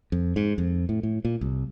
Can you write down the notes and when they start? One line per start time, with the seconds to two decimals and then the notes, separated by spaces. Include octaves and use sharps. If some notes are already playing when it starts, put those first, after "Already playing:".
0.12 F2
0.36 G#2
0.58 F2
0.89 A2
1.03 A2
1.25 A#2
1.41 C2